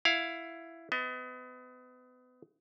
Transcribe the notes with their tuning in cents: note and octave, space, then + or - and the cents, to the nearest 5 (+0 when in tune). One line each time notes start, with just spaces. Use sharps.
E4 +10 F5 +15
B3 +30 D#5 +40